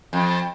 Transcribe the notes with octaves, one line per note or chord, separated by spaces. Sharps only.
F2